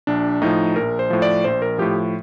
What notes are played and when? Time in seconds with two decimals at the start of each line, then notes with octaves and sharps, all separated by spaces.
0.07 A#1 D4
0.42 A2 F3 D#4
0.76 A#1 A#4
0.99 C5
1.10 A2 F3
1.22 D5
1.44 A#1 C5
1.62 A#4
1.78 A2 F3 G4